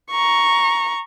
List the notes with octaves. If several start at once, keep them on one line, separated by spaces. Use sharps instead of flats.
A#5 C#6